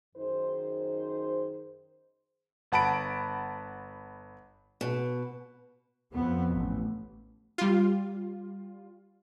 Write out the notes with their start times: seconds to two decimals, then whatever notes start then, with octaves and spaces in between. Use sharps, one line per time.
0.16 F#2 D#3 D#4 G#4 C5
2.72 G1 F#5 A5 B5 D7
4.81 B2
6.11 F2 B3
6.54 A1
7.58 G3 F4